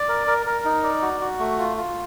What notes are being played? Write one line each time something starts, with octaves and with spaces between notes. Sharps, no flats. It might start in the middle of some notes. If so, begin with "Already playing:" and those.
Already playing: D5
A#4
A#4
A#4
D#4
D5
F#4
F#4
A3
F4
F4